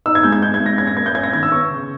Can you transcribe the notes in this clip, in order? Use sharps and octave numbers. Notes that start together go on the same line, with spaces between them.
D#4 E6
G#6
G#3 G6
G#6
D#4 G6
G#6
G#3
A#6
C#4 G#6
A#6
A#3 G#6
G6
C#4 G#6
A#6
D#3 G#6
E6
B3 C#6
C#3